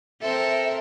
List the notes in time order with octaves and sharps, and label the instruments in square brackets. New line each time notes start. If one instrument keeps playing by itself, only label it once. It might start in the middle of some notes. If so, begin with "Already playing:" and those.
[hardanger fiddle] C4 A#4 [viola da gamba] A4 [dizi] E5